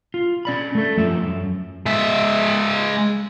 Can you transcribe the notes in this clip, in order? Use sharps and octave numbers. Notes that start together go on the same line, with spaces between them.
F4
C#4 D5 B5
A3 A4
F#2 F3 E5
F#2
G#3 E5